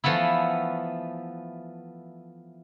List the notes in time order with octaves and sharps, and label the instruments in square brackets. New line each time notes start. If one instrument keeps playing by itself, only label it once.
[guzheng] E3 F3 A3 B3 E4